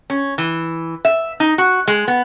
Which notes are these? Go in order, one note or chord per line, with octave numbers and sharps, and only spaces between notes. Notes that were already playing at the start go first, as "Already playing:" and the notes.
C#4
E3
E5
D#4
F#4
G#3
B3